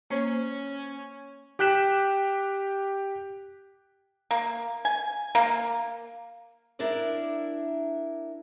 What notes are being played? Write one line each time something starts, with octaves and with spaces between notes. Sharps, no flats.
A#3 C#4 C5 C#5
G4 G5 F#6 B6 E7
A#3
G#5
A#3
D4 E4 A#4 D5